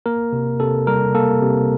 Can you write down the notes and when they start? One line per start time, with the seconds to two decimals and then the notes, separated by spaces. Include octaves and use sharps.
0.06 A#3 A#4
0.33 C3
0.60 C3 A4
0.87 G3 A#4
1.15 A#3 A4
1.41 C3